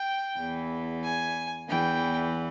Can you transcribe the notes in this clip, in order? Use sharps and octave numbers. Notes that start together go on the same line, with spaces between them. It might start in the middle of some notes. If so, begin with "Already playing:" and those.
Already playing: G5
E2 E3
G#5
E2 E3 G5